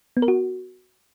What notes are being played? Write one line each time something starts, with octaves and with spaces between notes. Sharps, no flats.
B3
A#4
F#4